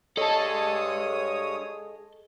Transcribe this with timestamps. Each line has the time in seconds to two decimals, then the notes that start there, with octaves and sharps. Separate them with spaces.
0.17 G2 G#4 A4 C#5 D#5 A5 D#6